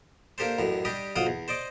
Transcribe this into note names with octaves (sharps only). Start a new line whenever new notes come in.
A#3 D4 G4 A4 C5
A1 F#2 A2
G3 D4 G4 D#5
B1 F4 C5 F#5 G5 D#6
E2
C5 D5 D#5 D6